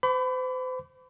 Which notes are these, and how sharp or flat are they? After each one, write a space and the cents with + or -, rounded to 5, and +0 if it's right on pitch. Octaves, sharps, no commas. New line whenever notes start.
C5 -40 B5 +30 D6 -35